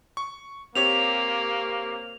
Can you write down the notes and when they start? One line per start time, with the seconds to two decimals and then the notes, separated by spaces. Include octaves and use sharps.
0.17 C#6
0.75 A#3 C4 G4 C#5 F7